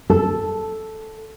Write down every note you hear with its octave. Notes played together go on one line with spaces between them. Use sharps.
A4